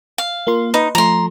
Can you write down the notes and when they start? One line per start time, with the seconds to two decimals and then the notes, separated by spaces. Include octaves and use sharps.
0.18 F5
0.47 A#3 F4 C6
0.74 D#4 B4 D#5
0.95 F3 A3 A#5 C6